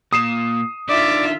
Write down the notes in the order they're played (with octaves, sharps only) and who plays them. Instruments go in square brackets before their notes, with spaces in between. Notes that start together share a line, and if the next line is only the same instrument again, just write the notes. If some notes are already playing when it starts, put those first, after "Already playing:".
[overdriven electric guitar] A#2 [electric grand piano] D#6 C7 E7
[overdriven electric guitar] D#3 D4 [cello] F4 E5 [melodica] D5 D6